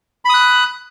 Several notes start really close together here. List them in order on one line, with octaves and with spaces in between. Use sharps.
B5 D#6 F#6